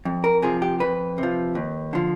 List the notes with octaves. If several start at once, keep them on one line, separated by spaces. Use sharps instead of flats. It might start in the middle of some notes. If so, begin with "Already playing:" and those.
F2
A#4
C3 F3 G#4
G4
F2 B4
C3
F3
D#2
D3 F3